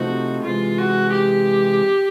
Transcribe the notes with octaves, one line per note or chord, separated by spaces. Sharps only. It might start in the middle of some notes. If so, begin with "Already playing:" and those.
Already playing: C3 F3 A3 C4 D#4 F#4
C3 E3 G#3 F4
F#4
G4